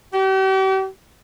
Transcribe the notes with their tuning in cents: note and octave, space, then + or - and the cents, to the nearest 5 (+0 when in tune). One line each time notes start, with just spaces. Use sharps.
G4 -40